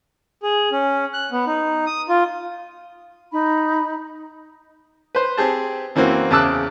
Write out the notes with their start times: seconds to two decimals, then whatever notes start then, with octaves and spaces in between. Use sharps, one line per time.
0.43 G#4
0.72 C#4
1.14 F#6
1.32 B3
1.47 D#4
1.86 D#6
2.09 F4
3.32 D#4 B5
5.15 B4 C5
5.37 C4 G4 G#4 A5
5.95 F#2 E3 A#3 C4 F#4
6.31 E2 C#3 A5 D6 E6 F#6